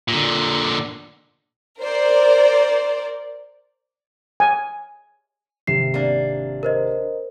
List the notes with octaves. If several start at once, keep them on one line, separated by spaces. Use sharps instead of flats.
A#2 D3
A#4 C5 D5
G#5
G#1 C3 C7 E7
A#3 D4
A#4 C5 D#5